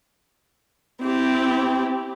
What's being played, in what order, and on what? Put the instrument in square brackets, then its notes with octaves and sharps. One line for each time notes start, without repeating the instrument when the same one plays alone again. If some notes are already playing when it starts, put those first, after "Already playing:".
[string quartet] C4 E4 G4